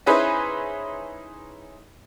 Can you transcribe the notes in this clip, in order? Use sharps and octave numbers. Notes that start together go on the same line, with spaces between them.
C#4 D#4 E4 G#4 B4 C5